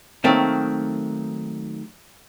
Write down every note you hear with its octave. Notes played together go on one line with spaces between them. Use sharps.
D#3 F#3 A3 A#3 C4